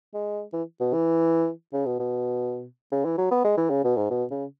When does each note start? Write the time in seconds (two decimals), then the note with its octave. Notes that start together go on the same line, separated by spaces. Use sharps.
0.14 G#3
0.53 E3
0.81 B2
0.93 E3
1.73 C#3
1.86 B2
2.00 B2
2.92 C#3
3.05 E3
3.18 F#3
3.31 B3
3.44 G#3
3.57 E3
3.70 C#3
3.84 B2
3.97 G#2
4.10 B2
4.31 C#3